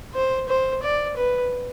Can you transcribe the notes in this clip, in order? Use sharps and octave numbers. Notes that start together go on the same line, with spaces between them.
C5
C5
D5
B4